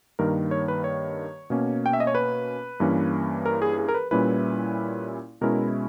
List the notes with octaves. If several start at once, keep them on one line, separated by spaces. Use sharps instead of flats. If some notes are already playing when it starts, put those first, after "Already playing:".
G2 D#3 A#3 A#4
C#5
B4
C#5
B2 A#3 C#4
G5
E5
D#5
C#5
B4
G2 E3 A#3 C#4
A#4
G#4
G#4
A#4
B4
A#2 G3 C#4 E4 B4
B2 G#3 C#4 E4 A#4